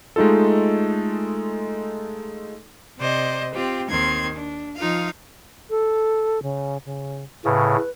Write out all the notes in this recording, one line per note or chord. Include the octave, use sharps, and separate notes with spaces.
G#3 A3 D#4 F4 A4
C3 C5 D5 D#5
C4 F4 G4
D#2 D#3 C4 C6 G#6
D4
F3 D#4 F4 F5
A4
C#3
C#3
A2 C#3 B4